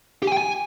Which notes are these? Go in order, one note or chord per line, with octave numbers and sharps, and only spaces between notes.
G4
G#5
G5
G#5